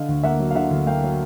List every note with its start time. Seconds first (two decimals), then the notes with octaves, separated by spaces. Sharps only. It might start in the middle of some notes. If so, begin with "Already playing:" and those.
Already playing: D3 D#5 F5
0.08 D2
0.24 A#3 E5 F#5
0.40 F#3
0.51 F5
0.55 D3 E5 F#5
0.71 D2
0.87 A#3 F5 G5
1.03 F#3